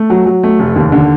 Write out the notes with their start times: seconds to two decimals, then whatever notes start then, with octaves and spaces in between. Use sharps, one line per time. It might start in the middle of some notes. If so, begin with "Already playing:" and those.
Already playing: A3
0.10 F#3
0.26 F#3
0.43 A3
0.59 F1
0.76 D#2
0.92 D3